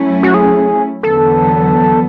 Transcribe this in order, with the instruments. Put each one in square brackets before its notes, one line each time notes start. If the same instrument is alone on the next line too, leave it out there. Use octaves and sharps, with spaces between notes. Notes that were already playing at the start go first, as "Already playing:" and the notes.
Already playing: [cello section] F#3 A3 C#4 E4
[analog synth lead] F#4
G#4
[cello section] E2 D3 F#3 B3 [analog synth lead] A4